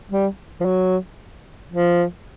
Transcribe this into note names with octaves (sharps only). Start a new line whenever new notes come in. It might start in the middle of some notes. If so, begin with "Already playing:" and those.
G3
F3
F#3
F3